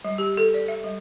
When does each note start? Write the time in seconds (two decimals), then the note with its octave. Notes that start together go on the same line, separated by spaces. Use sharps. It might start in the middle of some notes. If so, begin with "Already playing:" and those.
0.05 G3
0.18 G4
0.37 A4
0.54 D5
0.68 E5
0.84 G3